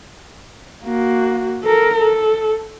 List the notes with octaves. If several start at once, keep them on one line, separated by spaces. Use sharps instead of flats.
A#3 F#4
A4 A#4
A4